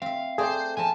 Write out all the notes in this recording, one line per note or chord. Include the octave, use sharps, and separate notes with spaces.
C4 E5 F5
A3 C4 G#4 C5 D5
F3 B3 C4 G#5 A5